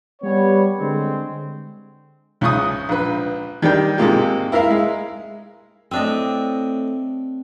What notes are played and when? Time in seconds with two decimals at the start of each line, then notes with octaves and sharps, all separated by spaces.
0.22 G3 B3 C#5
0.79 D3 G#3 C4
2.41 C#2 G#2 C#6 D#6
2.89 A#1 B4
3.62 D#3 G3 D4 G5
3.98 G#2 C3 G#3 A#3 F4 G4
4.52 E4 A#4 E5 F5
4.70 G#3
5.91 A2 C4 D4 D#5 E5 D#6